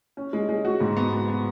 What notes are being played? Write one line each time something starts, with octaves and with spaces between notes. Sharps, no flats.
C#4
G#3
G#3
F#4
G#2
B3
B3
B3